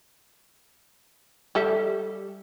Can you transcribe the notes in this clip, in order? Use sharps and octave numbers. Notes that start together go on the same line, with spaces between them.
G3 A4 E5